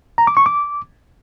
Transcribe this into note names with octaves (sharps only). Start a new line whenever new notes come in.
A#5
D6
C#6
D6